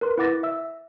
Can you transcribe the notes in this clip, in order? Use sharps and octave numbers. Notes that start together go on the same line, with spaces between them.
A#4 B4 C6
E4 B4 F#5 D6 A6 A#6
E5 E6